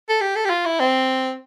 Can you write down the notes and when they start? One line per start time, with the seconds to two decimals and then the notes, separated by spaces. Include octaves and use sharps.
0.09 A4
0.21 G4
0.36 A4
0.45 G4
0.50 F4
0.65 E4
0.80 C4